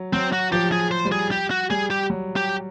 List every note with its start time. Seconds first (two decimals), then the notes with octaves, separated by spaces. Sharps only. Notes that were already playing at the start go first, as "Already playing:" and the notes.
Already playing: F#3
0.13 F#3 C4
0.33 F#4
0.52 F3 G4
0.72 G#4
0.91 C5
1.05 G3
1.12 G#4
1.31 G4
1.51 F#4
1.70 G3 G#4
1.90 G4
2.10 F#3
2.36 G4